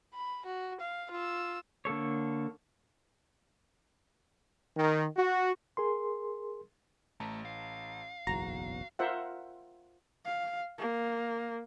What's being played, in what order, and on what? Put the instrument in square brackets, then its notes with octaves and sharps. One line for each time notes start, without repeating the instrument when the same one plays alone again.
[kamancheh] B5
F#4
F5
F4 E6
[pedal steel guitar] D3 A#3 A4 C#5
[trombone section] D#3
F#4
[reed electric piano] G#4 A#4 C6
[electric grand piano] A1 A5 A#5 [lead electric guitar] A3
[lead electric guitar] F5
[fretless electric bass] F#1 B1 E2 [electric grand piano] F#4 [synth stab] A#5
[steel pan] F4 A#4 C5 E5 F#5
[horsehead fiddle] F5
A#3